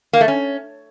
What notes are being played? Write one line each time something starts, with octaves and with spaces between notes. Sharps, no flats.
A#3
A3
C#4